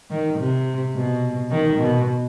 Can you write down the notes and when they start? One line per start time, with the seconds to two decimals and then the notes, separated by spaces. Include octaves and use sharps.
0.11 D#3
0.39 C3
0.95 B2
1.51 D#3
1.79 B2